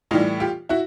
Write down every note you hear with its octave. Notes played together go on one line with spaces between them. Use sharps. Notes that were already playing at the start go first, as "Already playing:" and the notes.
A2 E3 G3 D#4 F4
F4 G4
E4 F#4